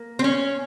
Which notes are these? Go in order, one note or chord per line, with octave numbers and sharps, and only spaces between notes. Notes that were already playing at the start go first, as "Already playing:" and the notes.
Already playing: A#3
C4
C#4